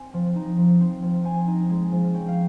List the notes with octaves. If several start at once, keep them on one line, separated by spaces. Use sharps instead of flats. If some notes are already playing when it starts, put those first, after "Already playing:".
Already playing: C4 D#4 G#5
F3
D#4
F3
C4
F3
C4 G#5
D#4
G#3
F3
C#4 G5
F5